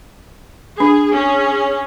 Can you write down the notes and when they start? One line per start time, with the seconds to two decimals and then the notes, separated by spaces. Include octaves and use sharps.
0.80 D4 G#4
1.13 C#4 G#4